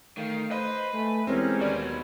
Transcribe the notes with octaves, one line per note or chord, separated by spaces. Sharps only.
D#3 A3 F5
B4 C5 D#5
A3 G#5
E2 G#3 C4 C#4 G4 A#4
D#2 B2 F#3 D5